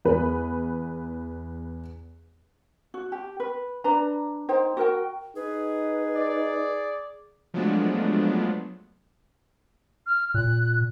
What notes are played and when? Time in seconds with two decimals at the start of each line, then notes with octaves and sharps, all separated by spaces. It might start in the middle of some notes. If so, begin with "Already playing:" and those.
0.05 E2 B4
2.94 F#4
3.12 G4
3.40 B4
3.84 D4 B4 A#5
4.49 D#4 C5 G5
4.77 F#4 A#4 G5
5.36 D#4 G#4 B4
6.16 D5
7.54 F3 F#3 G#3 A3 B3 D4
10.07 F6
10.34 A#2 F#6